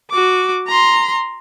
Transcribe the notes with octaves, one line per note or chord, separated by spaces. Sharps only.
F#4 D6
A#5 C6